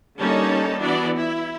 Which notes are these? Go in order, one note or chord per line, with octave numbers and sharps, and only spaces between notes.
D3 G3 A#3 C#4 D#4 A5
E3 B3 D4 F#4 D5
E4